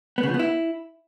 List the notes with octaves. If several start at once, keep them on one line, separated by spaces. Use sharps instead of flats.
B3
C#3
F3
B3
E4